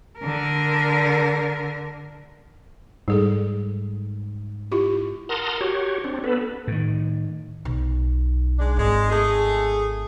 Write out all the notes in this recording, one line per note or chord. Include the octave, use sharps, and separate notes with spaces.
D3 A#4
G#2 G3 G#4 A4
E4 F4 G4
A#4 F#5 A5 A#5 C6 D#6
F#4 G4 C#5
C4 D4
B3 A4 B4
A2 D#3
B1
G#3 D4
G#1 G#3
A3 G#4